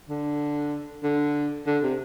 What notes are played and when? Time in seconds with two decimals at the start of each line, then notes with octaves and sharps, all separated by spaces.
0.09 D3
1.03 D3
1.67 D3
1.83 C3